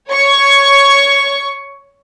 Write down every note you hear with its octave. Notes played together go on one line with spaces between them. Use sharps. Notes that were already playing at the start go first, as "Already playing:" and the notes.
C#5 C#6